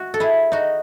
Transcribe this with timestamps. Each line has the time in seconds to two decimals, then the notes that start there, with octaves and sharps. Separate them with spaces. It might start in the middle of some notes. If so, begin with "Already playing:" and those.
Already playing: F#4
0.14 A4
0.20 E4 G#4
0.52 D#4 F#4